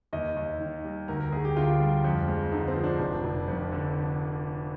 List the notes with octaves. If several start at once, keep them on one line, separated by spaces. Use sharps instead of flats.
D#2 D#5
D#2
D#3
G3
D2 A#4
A#4
D2 G#4
G4
D3 F4
G3
F2
G#3
D3 D#4
C4
F3
D4
F1
F1
F2
D3